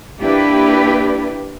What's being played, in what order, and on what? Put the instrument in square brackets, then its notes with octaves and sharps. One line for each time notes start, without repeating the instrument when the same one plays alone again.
[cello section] A#3 D4 E4 G4 B4